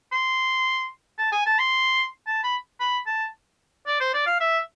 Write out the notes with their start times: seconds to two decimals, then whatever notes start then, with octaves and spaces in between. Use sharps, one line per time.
0.12 C6
1.18 A5
1.32 G#5
1.46 A5
1.59 C6
2.26 A5
2.44 B5
2.80 B5
3.06 A5
3.87 D5
4.00 C5
4.13 D5
4.26 F5
4.40 E5